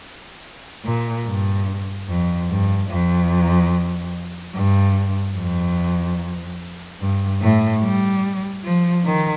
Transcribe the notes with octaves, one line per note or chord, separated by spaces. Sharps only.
A#2
G2
F2
G2
F2
G2
F2
G2
A2
G3
F3
D#3